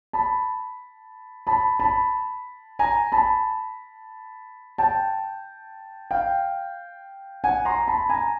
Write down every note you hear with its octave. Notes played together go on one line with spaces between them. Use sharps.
A5 B5
A5 B5
A5 B5
G#5 A#5
A5 B5
G5 A5
F5 G5
F#5 G#5
A#5 C6
A5 B5
G#5 A#5